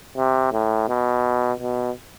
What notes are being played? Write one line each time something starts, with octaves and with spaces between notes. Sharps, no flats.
C3
A2
B2
B2